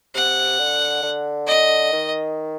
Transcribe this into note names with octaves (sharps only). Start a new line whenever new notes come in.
C3 F#5
D3
D3
D#5
D#3